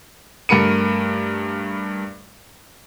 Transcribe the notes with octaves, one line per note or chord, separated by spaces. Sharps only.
G2 A3 A#4 B5 C#7 D#7